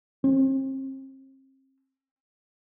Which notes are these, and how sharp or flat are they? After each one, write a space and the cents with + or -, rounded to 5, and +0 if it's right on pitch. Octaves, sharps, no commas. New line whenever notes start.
C4 +35